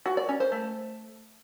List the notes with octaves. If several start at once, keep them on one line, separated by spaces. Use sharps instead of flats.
F#4
D5
C#4
C5
A3